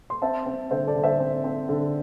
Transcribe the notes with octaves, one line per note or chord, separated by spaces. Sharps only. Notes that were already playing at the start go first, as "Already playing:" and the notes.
C6
C4 E5 A5
C4
D3 C5 E5
A4 D5
D3
C5 E5
C4
C4
D3